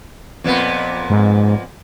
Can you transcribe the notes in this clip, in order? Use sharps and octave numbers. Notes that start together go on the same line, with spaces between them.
F2 A#2 B3
G#2